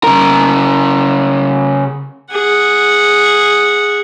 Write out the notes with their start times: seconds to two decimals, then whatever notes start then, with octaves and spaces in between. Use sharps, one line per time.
0.04 C#3 A#4
2.32 G#4 F#5